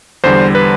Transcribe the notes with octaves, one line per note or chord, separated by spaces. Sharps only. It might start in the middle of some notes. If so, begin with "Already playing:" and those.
E2 D3 G3 C5
B4